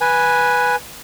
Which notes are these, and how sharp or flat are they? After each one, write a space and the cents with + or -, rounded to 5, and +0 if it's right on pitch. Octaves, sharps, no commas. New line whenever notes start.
B4 -10 G#5 +0